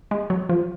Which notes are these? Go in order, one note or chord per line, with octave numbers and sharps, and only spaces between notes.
G#3
F#3
F3